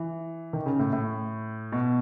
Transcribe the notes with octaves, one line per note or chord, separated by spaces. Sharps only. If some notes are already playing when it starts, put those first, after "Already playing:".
Already playing: E3
D#3
C#3
A2
A2
B2